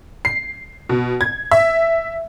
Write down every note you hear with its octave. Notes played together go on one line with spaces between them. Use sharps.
C7
B2
G#6
E5